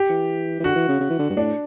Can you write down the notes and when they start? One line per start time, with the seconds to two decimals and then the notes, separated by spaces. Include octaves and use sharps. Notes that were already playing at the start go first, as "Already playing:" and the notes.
Already playing: G4
0.10 E3
0.60 E3
0.64 D3 F#4
0.76 E3
0.88 C#3
1.00 C#3
1.10 E3
1.19 D3
1.30 G2
1.36 A2 D4